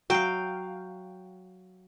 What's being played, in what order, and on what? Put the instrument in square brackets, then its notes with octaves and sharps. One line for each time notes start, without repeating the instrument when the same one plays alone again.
[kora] F#3 [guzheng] F5 G5